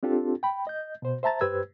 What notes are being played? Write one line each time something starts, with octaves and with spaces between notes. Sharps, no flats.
C4 D4 F4 G4 A4
G5 B5
D#5 G6
B2 C5
C5 E5 A5 A#5 A6
G2 G4 B4 C5 E6 G#6